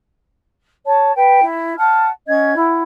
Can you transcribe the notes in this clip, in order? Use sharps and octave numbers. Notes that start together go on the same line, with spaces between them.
C#5 A5
B4 G5
E4
F#5 A5 F6
C#4 D#5 F#5 G#6
E4 F#5